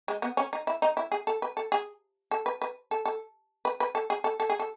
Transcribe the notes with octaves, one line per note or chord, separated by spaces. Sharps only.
G#3
B3
C#4
D#4
E4
D#4
E4
G#4
A4
B4
A4
G#4
A4
B4
B4
A4
A4
B4
B4
A4
G#4
A4
A4
G#4
A4